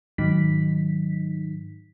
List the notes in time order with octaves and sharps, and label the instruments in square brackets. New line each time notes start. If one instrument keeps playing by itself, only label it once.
[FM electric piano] G#2 D#3 F#3 D#4 B6